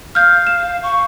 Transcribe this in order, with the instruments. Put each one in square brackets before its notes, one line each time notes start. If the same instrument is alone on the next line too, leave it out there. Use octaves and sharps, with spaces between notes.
[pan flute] F5 [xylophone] F6 G6
[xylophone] E7
[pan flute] C#6